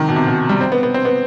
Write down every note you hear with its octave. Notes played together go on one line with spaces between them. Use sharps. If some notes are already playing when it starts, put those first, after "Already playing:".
Already playing: C3 D#3
B2
C3
B2
G3
C4
B3
B3
C4
B3